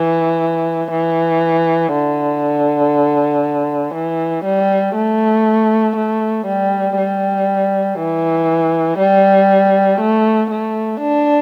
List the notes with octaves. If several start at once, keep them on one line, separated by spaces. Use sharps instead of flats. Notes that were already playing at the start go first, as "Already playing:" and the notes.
Already playing: E3
E3
D3
E3
G3
A3
A3
G3
G3
E3
G3
A3
A3
D4